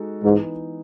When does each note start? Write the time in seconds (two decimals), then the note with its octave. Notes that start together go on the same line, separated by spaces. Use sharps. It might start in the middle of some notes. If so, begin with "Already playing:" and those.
Already playing: G#3 D#4 F#4 A4
0.24 G#2 E3 B3 D#4